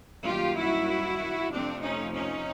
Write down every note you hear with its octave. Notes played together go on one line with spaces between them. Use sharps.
F#2 D#3 G3 A#3 F4 G4
E4 F#4
F2 C3 F3 A3 C4 D4
C#4 D#4
C#4 D#4